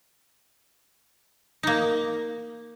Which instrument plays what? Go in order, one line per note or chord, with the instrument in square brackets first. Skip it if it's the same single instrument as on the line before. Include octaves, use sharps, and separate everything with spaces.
[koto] A#3 D#4